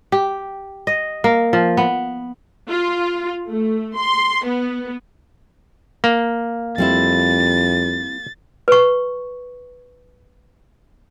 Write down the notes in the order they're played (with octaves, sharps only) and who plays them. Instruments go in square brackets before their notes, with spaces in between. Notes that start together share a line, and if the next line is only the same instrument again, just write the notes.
[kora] G4
D#5
A#3
F3
B3
[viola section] F4
A3
C6
B3
[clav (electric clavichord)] A#3
[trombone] F2 [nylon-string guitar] G3 C4 E4 [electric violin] A6
[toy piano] B4 C#6